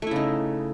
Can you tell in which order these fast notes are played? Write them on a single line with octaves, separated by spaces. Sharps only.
A3 E4 C#3 D#4